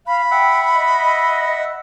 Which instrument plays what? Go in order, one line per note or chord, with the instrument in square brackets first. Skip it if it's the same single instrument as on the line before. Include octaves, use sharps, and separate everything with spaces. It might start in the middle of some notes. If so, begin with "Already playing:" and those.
[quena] F5 [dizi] B5
[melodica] E5 F#5 [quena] G5
[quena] D#5